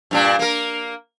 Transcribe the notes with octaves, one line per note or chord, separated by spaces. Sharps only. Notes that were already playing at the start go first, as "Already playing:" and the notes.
G2 A#2 D4
A#3 A#4